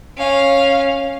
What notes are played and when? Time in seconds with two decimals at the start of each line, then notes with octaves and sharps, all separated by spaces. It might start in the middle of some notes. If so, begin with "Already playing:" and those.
0.17 C#4 F5